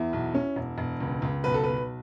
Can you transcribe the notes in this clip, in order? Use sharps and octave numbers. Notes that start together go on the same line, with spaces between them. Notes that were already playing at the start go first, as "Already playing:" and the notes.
Already playing: E2 E4
B1
C#4
E1
E1
C#2
C#2
B1 B4
A4
B1 B4